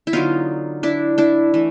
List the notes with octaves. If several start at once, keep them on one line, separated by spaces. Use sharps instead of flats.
E4
D3 F#3 B3 D#4 F4
D4 E4
D4 E4
E3 A3